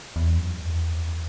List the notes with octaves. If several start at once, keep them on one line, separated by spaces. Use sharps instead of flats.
E2
F#2
E2